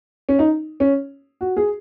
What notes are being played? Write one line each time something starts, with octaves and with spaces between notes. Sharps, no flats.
C#4
D#4
C#4
F#4
G#4